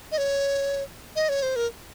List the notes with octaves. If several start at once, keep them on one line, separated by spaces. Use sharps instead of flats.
D#5
C#5
D#5
C#5
C5
A#4